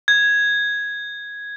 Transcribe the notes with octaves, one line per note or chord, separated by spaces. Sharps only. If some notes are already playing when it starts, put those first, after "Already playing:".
G#6